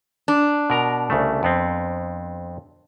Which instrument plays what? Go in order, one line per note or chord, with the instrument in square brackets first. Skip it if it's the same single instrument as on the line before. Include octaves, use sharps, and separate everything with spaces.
[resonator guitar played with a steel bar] D4
[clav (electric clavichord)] B2 A#4 A#5
C2 C#3 A3
F2 B3 C4